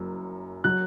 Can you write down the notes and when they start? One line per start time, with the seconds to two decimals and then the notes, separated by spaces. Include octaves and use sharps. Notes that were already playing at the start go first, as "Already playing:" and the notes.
Already playing: F#1 F#2 F#3
0.64 F#3 F#6